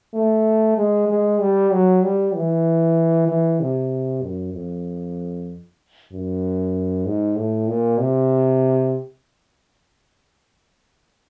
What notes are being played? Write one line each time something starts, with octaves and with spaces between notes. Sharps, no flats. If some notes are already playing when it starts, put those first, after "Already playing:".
A3
G#3
G#3
G3
F#3
G3
E3
E3
C3
F#2
F2
F#2
G#2
A2
A#2
C3